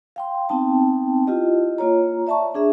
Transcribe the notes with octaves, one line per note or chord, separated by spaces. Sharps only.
F5 G5 C6
B3 C4 D#4 G5 A5
E4 F4 G4 D#5
A#3 F4 C#5 A#5
D5 E5 A5 A#5 C#6
D4 G#4 E5